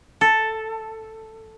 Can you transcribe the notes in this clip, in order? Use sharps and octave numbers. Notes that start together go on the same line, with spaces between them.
A4